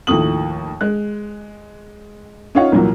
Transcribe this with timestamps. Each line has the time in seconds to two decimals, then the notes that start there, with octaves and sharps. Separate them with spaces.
0.07 D#2 A2 F3 A3 D#6 F#7
0.81 G#3 F#6
2.55 C#4 D#4 F4 C#5 F5 F#5
2.72 C2 A#2 E3 F#3